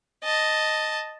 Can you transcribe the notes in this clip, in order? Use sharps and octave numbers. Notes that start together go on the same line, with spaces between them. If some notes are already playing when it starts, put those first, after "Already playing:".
D#5 A5